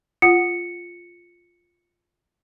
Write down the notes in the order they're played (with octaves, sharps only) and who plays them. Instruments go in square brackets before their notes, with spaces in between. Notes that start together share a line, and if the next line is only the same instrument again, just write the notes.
[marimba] F4 F#5 D#6 [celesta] C#7